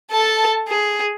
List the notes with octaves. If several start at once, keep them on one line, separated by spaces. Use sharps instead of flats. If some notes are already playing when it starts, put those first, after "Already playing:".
A4 A5
G#4